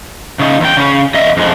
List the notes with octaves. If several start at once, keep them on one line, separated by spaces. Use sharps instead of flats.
C#3 D#4
E2 G5
C#3 C#4
E2 D#5 E5
F2 G#3